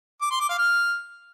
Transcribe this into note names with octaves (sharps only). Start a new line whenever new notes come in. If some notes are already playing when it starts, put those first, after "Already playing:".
D6
C6
D6
F5
F6